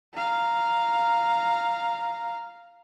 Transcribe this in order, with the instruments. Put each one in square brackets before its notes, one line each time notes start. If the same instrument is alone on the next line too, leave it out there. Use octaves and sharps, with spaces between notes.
[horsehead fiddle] F5 A#5